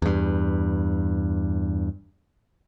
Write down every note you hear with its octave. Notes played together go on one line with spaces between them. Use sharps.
E2 G2